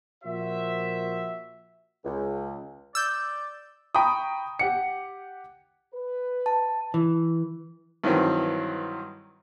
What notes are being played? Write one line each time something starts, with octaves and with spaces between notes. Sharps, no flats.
A#2 F3 F#4 C5 E5
C#2
D5 E6 G6
G5 A#5 B5 C#6 D#6
G4 F#5 C#7
B4
A5
E3
G2 D#3 E3 F#3 C4